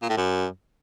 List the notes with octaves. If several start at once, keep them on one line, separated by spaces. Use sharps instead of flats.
A#2
A2
F#2